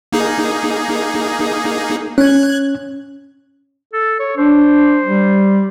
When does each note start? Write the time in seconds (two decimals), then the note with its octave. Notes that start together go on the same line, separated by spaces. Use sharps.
0.12 A#3 D#4 G#4
2.18 C#4 F#6 G#6
3.93 A4
4.19 C#5
4.37 D4 C5
5.05 G3